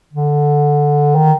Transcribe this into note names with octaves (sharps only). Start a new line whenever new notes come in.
D3
D#3